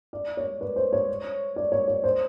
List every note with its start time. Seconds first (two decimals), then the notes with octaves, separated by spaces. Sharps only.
0.13 D5
0.37 C#5
0.61 B4
0.76 C5
0.93 C#5
1.56 D5
1.72 C#5
1.88 C#5
2.04 C5